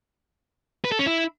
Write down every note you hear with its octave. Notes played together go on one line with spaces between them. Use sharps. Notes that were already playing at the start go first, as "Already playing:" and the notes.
B4
A4
C#4
E4